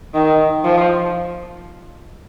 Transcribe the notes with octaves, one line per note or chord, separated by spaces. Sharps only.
D#3
F3